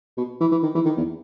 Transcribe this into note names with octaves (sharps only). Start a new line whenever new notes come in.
B2
E3
E3
D#3
E3
D#3
E2